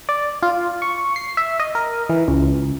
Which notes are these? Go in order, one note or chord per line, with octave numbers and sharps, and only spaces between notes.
D5
F4
C#6
C7
E5
D#5
A#4
E3
C#2